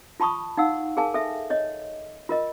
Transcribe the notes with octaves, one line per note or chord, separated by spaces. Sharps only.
F4 A5 B5 C#6 D#6
D#4 F5 F#5 E6
G#4 A#4 F5 G#5 A5
A4 E5
C#5 D#5
F4 A#4 D#5